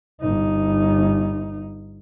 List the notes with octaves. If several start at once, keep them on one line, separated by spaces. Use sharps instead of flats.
G1 D#4